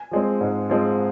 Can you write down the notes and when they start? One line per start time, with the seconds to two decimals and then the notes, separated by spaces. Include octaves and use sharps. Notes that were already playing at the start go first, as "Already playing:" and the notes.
Already playing: G#5
0.11 F3 G#3 C4
0.41 G#2
0.69 F3 G#3 C4